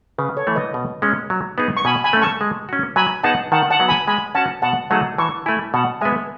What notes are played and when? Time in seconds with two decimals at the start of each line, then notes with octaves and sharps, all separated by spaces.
0.18 C#3 B4
0.37 A4 C#5
0.47 E3 A3
0.55 B4 D#5
0.74 B2
1.02 G#3 C#4
1.30 F#3
1.58 B3 D#4 G#4
1.77 C#6
1.85 B2 G#5 B5
2.04 G#5 B5
2.13 A3 C#4
2.22 A5 C#6
2.41 G#3
2.69 C#4 F#4
2.96 F#3 G#5 B5
3.23 B3 D#4 G#4 F#5 A5
3.52 D#3 F#5 A5
3.70 F#5 A5
3.80 F#3 B3 F#4
3.88 G#5 B5
4.07 G#3 G#5 B5
4.35 C#4 F#4 F#5 A5
4.62 B2 F#5 A5
4.90 F#3 A3 D#4 G#4 F#5 A5
5.18 E3 A5 C#6
5.46 A3 E4 G#5 B5
5.74 B2 F#5 A5
6.01 G#3 B3 E5 G#5